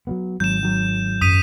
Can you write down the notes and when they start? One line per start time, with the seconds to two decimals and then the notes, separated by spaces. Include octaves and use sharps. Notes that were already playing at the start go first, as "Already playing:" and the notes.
0.07 F#3 G3 B3
0.40 G#1 F#3 G6 E7
0.63 D#3 F#3
1.21 F#2 D#6 B6 D#7